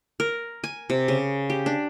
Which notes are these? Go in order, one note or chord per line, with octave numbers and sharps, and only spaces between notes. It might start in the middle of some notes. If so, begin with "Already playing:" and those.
A#4
G#5
C3
C#3
G4
D4